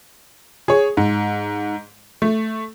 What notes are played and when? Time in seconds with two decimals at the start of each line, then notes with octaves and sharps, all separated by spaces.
0.68 G#4 C#5
0.97 G#2
2.22 A3